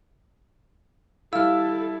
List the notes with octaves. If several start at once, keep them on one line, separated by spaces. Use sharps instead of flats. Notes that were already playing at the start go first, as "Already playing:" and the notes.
G3 E4 A4 F5 E6 F6